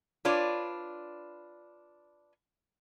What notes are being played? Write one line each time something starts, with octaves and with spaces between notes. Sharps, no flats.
D4 F4 B4 C#5 D5